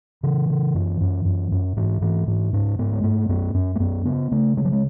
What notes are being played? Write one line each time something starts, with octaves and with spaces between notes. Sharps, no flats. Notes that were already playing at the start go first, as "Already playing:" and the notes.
C#3 E3
C#3
F#2
F#2
F#2
F#2
G#2 E3
G#2 E3
G#2 E3
G#2 C#4
G#2 B3
G#3
G#2 A3
F#2 B3
F#2 C#4
A3
F#2 B3
C#3 B3
C#3 A3
C#3 G#3
F#3
G#3